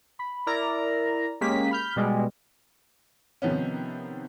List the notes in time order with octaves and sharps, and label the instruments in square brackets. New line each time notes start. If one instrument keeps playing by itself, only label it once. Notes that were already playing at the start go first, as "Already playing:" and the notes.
[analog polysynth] B5
E4 A#4 D5 A#5
G#3 A#3 C#4 G4 B6
B5 F6 G6
B2 G3 G#3
[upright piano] C3 D#3 F3 B3 C#4